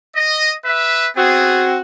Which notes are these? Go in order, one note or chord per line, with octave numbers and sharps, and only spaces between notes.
D#5
B4 E5
B3 C4 F#4 G#4